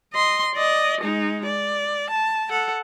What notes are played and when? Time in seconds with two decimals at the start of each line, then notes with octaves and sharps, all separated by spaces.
0.13 D#5 C6
0.55 D5 D#5
1.01 G#3 D#4
1.46 D5
2.10 A5
2.50 A4 F#5